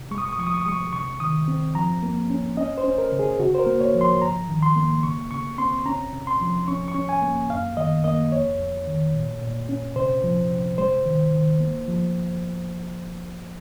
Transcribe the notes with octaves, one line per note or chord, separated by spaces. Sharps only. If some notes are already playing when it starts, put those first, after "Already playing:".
Already playing: C3
G#3 C#6
D#6
C#6
D#6
F3 C#6
D#6
C#6
D#6
G#3 C#6
C3 C#6
D#3 D#6
C4
F3 A#5
A#3
C#4
C#4 D#5
C5
C#4
A#4
C#3
G#4
C#3 F#4
C5
A#4
A#3
C#5
F3
C6
G#2 A#5
D#3
C6
A#3
C#3 C#6
C#3 C#6
C4 C6
C#4 A#5
C3
C6
F3
C#4 C#6
C#6
C#4
G#5
A#3
F#2 F5
D#3 D#5
A#3 D#5
F2 C#5
F2
D#3
A#2
A#2
C#4
C3 C5
F3
C3
G#3 C5
D#3
D#3
A#3
F3